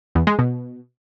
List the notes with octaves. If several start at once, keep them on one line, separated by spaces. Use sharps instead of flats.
E2
G#3
B2